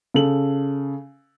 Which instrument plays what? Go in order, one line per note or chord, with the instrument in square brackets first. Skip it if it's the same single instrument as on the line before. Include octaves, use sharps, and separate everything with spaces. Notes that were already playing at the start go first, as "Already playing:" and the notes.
[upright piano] C#3 A4 F#7